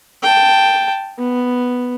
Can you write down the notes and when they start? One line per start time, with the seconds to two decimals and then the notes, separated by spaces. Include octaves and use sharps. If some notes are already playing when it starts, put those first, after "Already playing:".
0.23 G5 A5
1.19 B3